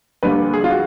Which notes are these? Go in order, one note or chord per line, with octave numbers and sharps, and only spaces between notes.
D2 D3 G3 A#3 B4
G#4
F4
F#4